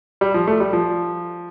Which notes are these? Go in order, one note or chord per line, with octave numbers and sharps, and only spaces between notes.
G3
F3
A3
G3
F3